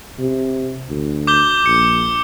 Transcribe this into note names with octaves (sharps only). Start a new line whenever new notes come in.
C3
D2
D6 G6 G7
A#1 C#7